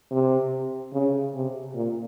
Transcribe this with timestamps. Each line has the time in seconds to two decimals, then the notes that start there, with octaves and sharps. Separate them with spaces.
0.11 C3
0.93 C#3
1.34 C3
1.75 A#2